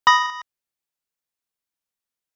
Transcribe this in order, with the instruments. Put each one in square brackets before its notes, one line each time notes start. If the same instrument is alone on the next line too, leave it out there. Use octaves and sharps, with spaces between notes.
[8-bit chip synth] B5 D#6 A#6